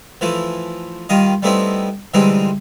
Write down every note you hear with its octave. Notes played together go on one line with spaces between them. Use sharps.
E3 F3 A3 E4
D#3 G3 F4 D#5
G3 A3 B3 C4 D#4 E4
D3 E3 G3 G#3 C4 D#4